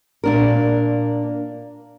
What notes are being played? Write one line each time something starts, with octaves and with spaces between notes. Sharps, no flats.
A#2 A#3 D4 A#4